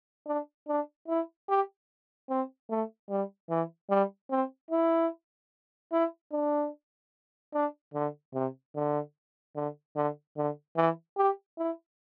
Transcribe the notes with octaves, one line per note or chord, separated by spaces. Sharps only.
D4
D4
E4
G4
C4
A3
G3
E3
G3
C4
E4
E4
D4
D4
D3
C3
D3
D3
D3
D3
E3
G4
E4